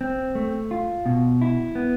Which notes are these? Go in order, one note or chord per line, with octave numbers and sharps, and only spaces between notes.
C4
A3
F4
B2
E4
B3